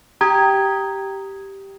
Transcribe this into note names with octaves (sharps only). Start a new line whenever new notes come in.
G4 A#5 D#6 G#6